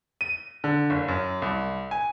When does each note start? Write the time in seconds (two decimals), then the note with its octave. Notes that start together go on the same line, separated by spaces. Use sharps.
0.21 D#7
0.64 D3
0.90 F#1
1.08 F#2
1.42 C2
1.91 G#5